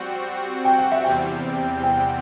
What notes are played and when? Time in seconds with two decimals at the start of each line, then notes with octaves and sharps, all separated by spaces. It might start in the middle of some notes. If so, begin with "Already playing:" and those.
Already playing: G3 C4 F#4 F#5
0.65 G5
0.78 F#5
0.92 E5
1.05 E2 C3 G3 C4 G5
1.84 G5
1.97 F#5